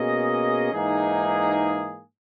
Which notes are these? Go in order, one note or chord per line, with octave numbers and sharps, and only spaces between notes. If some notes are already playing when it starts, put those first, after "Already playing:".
Already playing: B2 A#3 C#4 G#4 D#5
G#2 E3 A#3 D#4 G#4